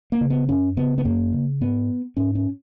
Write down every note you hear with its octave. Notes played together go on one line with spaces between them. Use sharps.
A#3
C#3
B3
F#2 C#4
C#3 B3
B3
F#2 A#3
C#3
G#2 B3
G#2 C#4
C#4